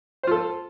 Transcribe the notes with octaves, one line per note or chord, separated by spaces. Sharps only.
F4 A4 C5